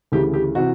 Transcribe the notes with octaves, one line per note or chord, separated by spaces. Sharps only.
D2 C#3 E3 G4
G4
C3 E3 F#4